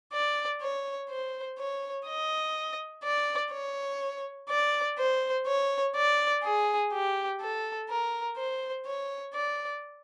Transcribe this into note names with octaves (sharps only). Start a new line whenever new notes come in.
D5
C#5
C5
C#5
D#5
D5
C#5
D5
C5
C#5
D5
G#4
G4
A4
A#4
C5
C#5
D5